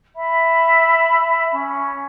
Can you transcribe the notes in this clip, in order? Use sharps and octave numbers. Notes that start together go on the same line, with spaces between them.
E5 B5
C#4